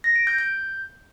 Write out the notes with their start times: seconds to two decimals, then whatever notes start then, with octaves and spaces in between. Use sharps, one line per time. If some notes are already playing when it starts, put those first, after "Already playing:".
0.04 A#6
0.16 D7
0.27 G6
0.38 G6